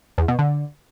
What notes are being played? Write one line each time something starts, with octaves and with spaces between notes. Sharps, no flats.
E2
B2
D3